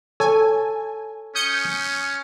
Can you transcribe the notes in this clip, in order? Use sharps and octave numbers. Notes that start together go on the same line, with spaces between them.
A4 C#5 G#5
C#4 D#6 G6 C#7